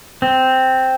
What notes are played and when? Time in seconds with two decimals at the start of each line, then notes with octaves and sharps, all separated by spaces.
0.22 C4